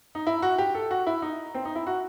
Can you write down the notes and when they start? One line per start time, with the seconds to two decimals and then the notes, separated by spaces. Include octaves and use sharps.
0.15 D#4
0.27 E4
0.42 F#4
0.58 G4
0.75 A4
0.91 F#4
1.07 E4
1.22 D#4
1.55 C4
1.65 D#4
1.75 E4
1.87 F#4